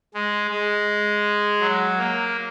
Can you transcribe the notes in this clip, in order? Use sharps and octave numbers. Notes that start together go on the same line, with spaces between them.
G#3
G#3
F#3
A#3